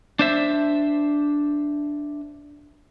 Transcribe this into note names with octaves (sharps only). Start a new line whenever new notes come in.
D4 C5 E5